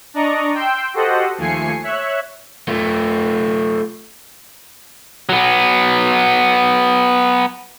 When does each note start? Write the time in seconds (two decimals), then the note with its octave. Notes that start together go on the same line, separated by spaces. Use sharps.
0.14 D4 D5 D#5 A#5 C#6
0.54 G5 C6 E6 G6
0.94 F#4 G4 A4 C5 D#5 F#5
1.38 D#2 F3 A3 G#5 C7 C#7
1.83 C#5 E5 F#6
2.68 A3 F4
5.29 F#3 B3